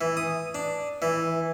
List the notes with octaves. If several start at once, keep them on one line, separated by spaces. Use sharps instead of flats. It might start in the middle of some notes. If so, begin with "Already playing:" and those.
E3
D#6
D4
E3